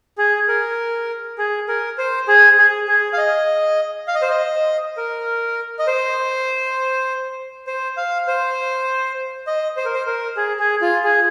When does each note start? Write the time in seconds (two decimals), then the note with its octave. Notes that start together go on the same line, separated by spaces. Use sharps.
0.18 G#4
0.48 A#4
1.38 G#4
1.68 A#4
1.98 C5
2.28 G#4
2.58 G#4
2.88 G#4
3.13 F5
3.18 D#5
4.08 F5
4.15 D#5
4.22 C5
4.30 D#5
4.97 A#4
5.79 D#5
5.87 C5
7.67 C5
7.97 F5
8.27 C5
9.47 D#5
9.77 C5
9.85 A#4
9.94 C5
10.06 A#4
10.37 G#4
10.59 G#4
10.82 F4
11.04 G#4